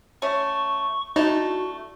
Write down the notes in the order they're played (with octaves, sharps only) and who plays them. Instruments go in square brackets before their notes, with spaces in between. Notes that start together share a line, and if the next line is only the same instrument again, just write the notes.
[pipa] A3 C#4 [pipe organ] C#6
[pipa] D3 A3 E4 [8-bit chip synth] D#4 [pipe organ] F#4